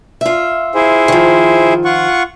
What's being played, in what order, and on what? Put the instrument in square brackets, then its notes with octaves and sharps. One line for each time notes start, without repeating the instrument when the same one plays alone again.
[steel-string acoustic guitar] F4 E5
[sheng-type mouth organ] E4 G#4 C5
[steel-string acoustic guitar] D#3 F3
[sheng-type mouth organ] F4 F#5 C#6